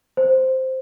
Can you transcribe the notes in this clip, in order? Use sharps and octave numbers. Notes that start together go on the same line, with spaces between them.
C5